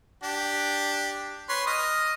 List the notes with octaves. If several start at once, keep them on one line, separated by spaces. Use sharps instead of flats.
D4 G4
B4 C#5 C6
D#5 D#6 F6